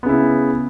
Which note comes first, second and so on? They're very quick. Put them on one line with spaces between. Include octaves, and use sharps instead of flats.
B3 C#3 E4